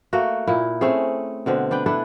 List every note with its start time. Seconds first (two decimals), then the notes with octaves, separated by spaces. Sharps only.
0.13 A3 A#3 F#4
0.47 A#2 E4
0.81 A3 C4 C#4 G#4
1.46 B2 D3 C4 D4
1.71 D4 B4 G5
1.86 D4 E4 A4 B4